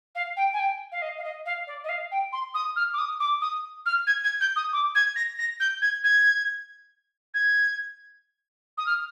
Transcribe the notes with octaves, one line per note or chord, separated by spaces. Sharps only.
F5
G5
G#5
G5
F5
D#5
F5
D#5
F5
D5
D#5
F5
G5
C6
D#6
F6
D6
D#6
D6
D#6
F6
G#6
G#6
G6
D#6
D6
G#6
A#6
A#6
G6
G#6
G#6
G#6
D#6
F6